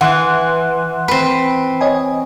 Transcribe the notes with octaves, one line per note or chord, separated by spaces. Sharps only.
E3 F#5 C6 F#6
C4 B4
C#5 D#5 G#5